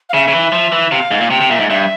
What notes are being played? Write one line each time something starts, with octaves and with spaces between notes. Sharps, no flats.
F5
C#3 E5
C#3
E3
F3
E3
C3 F5
G#2
A#2
C3 G5
C3
A#2 E5
G#2
G2 E5